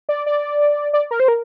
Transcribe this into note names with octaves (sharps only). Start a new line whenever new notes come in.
D5
D5
D5
A#4
C5
A#4